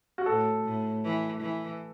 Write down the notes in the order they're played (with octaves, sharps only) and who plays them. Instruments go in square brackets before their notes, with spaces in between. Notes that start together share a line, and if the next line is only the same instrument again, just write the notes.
[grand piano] F#4
[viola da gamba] A2 [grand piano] A4
[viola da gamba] A2
E3
E3